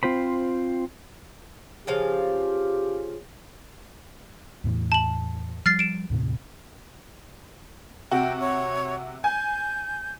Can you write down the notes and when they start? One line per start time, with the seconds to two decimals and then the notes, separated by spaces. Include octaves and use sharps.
0.03 C4 F4 C5 B5
1.87 C#3 F3 G4 F5
4.64 E2 A2 E3
4.92 A5 F#7
5.66 F3 G3 F6 A6 C7
5.79 D7 E7
6.10 D#2 A2 C3
8.11 C3 F#4 G5
8.41 C#5
9.24 G#5 G6